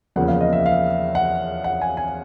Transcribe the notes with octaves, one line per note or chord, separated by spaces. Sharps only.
E2 C#3 F3 A#3 F#5
F5
D#5
E5
F5
F#5
F#5
G#5
G#5